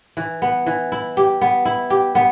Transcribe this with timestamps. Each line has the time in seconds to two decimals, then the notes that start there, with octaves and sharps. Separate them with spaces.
0.17 E3
0.42 B3
0.66 E3
0.92 E4
1.17 G4
1.41 B3
1.65 E4
1.90 G4
2.15 B3